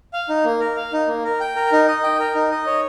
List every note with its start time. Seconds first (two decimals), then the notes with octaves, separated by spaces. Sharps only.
0.13 F5
0.29 D#4
0.45 A#3
0.60 A#4
0.76 F5
0.93 D#4
1.08 A#3
1.24 A#4
1.40 G5
1.56 A#4
1.72 D#4
1.88 D#5
2.04 G5
2.19 A#4
2.35 D#4
2.51 D#5
2.66 C#5